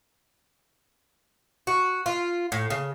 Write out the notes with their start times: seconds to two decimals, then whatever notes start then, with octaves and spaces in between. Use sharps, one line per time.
1.67 F#4
2.06 F4
2.52 A2
2.70 C#3